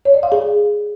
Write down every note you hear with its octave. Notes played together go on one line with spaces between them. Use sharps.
C#5
D5
F5
G#4